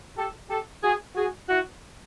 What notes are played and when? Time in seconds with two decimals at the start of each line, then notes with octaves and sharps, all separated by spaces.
0.16 G4 A4
0.49 G4 A4
0.83 F#4 G#4
1.16 F#4 G#4
1.49 E4 F#4